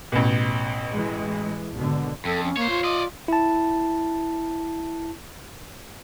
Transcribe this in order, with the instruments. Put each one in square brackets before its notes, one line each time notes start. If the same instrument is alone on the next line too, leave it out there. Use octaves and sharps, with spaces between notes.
[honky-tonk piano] A1 B2
[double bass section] E3 G#3
G#1 B2 D3
[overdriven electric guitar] F2 [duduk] A4
[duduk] C#4
[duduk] A#3 [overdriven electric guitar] C5 C#5
[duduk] F4
[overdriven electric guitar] D5 D#5
[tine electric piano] E4 A5